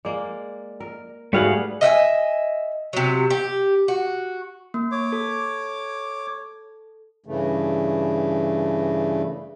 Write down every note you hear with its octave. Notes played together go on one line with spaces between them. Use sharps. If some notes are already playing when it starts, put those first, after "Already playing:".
G#3 A#3 D5
A#4
G#2 G3 A3 B3 F#4 G#4 F5 F#5
D#5 E5 F#5 G#5
C3 F#3
G4
F#4
A#3
C#5 D6
A4
G2 C#3 E3 A3